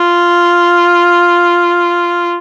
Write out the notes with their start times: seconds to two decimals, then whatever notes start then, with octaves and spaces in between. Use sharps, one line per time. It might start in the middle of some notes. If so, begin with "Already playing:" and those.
Already playing: F4